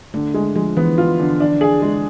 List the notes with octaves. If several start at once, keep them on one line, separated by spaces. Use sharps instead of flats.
D3 A3
G#3
F3 G#3
E3 B3
F4
D3
D4
G#4
G#3